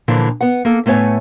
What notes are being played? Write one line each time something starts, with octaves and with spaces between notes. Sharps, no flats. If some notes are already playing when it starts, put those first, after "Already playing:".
A#2 D3 E3 F3 D4
B3 F#5
A#3 A4
A2 A3 B3 C#5 G#5